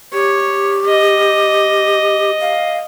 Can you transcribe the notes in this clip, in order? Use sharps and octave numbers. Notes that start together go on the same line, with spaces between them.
G4 C#5
D#5
F5